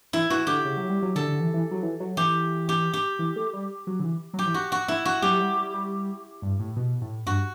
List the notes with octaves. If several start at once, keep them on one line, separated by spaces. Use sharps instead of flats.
E3 E4
E3 F#4
D3 G4
C#3
F#3
G3
F#3
D3 A4
D3
E3
E3
F#3
E3
F#3
E3 G4
G4
G4
E3
A3
G3
F#3
D3
E3
F#3
G4
E3
F#4
F#4
E4
F#4
F#3 G4
G3
G3
G3
G2
A2
B2
A2
G2 F#4